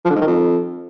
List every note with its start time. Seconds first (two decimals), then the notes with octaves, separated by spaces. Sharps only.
0.05 F3
0.10 D3
0.16 G#2
0.22 D#3
0.27 F2